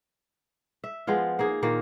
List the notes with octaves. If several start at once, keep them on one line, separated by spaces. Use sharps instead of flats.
E5
F3 G#3 B3 F4
A#3 D#4 G#4
A#2 D#3 A#3